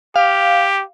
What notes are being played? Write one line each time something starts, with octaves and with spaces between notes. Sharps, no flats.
G4 F5